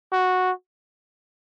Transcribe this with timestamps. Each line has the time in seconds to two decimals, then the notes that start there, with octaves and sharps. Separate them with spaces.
0.12 F#4